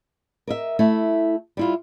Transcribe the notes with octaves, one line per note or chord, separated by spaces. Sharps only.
A#4 D#5 E5
A3 E4
G3 E4 F4